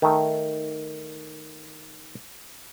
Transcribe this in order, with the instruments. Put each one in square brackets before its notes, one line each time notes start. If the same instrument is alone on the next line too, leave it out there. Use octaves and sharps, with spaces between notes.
[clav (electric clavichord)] D#3 A3